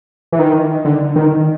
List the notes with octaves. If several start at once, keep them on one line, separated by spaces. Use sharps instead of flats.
E3
D#3
D3
D#3